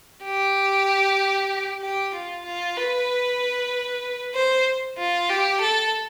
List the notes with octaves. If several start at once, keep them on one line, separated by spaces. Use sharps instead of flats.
G4
G4
F4
F4
B4
C5
F4
G4
A4